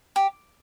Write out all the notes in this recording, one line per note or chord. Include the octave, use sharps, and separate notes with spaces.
G4